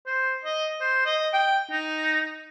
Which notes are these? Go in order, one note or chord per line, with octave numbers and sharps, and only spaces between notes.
C5
D#5
C5
D#5
G5
D#4